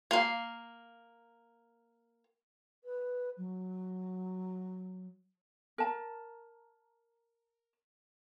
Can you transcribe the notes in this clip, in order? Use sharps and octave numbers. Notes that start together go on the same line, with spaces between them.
A#3 F5
B4
F#3
A#4 A5